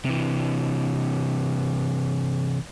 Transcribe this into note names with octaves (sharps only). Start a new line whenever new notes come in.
C3 E3